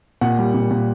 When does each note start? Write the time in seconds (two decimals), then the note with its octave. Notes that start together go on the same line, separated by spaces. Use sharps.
0.21 A#2 F#5
0.39 G3
0.54 A#2
0.71 A#2